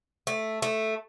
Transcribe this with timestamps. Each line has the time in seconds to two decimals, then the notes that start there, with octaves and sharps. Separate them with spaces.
0.27 A3
0.62 A3